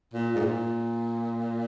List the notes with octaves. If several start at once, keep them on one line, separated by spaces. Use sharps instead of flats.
A#2
G#2
A#2